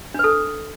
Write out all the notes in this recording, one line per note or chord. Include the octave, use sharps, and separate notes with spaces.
D4 A4 B4